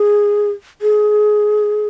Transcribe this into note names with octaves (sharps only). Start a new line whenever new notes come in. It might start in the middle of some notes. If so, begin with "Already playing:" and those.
Already playing: G#4
G#4